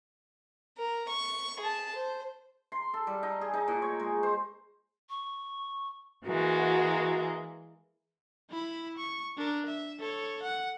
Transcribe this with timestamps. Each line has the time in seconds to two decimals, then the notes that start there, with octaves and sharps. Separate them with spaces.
0.78 A#4
1.09 C#6
1.60 G#4 A5
1.95 C5
2.72 C6
2.94 A4
3.07 G3
3.23 D#4
3.41 G#4
3.54 D#4
3.68 A#2
3.82 C#5
4.00 G#3
4.23 C5
5.10 C#6
6.25 E3 G#3 A#3 F#4
8.50 E4 B5
8.97 C#6
9.37 D4 A#4
9.66 E5
9.99 A4 C#5
10.42 F#5